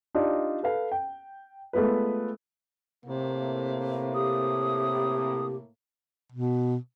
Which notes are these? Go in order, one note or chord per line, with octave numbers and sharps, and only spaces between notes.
D4 D#4 F4 G4 D5
A4 B4 F5
G5
G#3 A3 B3 F4 B4
A2 C3 A#3
G4 D#6
B2